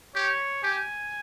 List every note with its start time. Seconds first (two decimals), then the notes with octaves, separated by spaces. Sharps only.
0.15 G4 C#5
0.64 G4 G#5